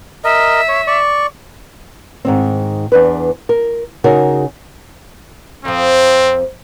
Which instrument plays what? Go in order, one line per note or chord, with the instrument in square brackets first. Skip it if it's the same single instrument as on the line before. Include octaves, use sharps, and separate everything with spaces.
[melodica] A#4 D#5 [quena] E5
[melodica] C#5
D5 C#6
[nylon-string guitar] G#2 D#3 C4
E2 D4 B4
A#4
C#3 D#4 F#4 G#4 A#4
[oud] F2 F3 [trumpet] C4